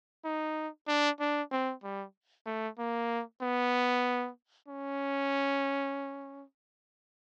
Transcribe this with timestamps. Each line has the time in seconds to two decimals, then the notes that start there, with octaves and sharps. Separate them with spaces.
0.25 D#4
0.88 D4
1.20 D4
1.52 C4
1.83 G3
2.46 A3
2.78 A#3
3.41 B3
4.68 C#4